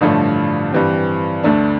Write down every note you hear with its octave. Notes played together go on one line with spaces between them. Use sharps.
A1 G2 D3 F3 A3
G2 E3 G3 C4
D2 D3 A3 D4